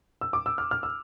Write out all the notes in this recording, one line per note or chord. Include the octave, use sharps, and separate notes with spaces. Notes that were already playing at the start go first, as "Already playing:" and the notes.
E6
D6
E6
F6
F6
E6